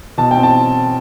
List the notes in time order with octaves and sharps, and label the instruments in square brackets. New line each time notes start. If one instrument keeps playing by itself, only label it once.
[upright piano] B2 A5
G5
C4
A5